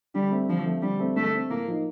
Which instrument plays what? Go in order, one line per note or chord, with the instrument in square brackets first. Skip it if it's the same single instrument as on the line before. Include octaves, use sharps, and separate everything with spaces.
[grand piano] D3 [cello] G3
[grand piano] A3 C4
[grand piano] D3 [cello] F3
[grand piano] A3 C4
[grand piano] D3 [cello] G3
[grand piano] A3 C4
[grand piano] D3 [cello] A3
[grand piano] A3 C4
[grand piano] A2 [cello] A#3
[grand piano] F3 A#3 D#4